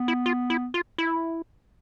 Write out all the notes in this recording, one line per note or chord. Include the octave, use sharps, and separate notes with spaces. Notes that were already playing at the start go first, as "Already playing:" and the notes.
Already playing: B3
E4
F4
E4
F4
E4